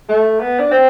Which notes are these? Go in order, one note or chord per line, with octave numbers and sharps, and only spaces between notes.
A3
B3
D4
C4